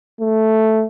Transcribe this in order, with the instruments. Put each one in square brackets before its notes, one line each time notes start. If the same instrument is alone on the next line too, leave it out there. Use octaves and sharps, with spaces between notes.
[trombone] A3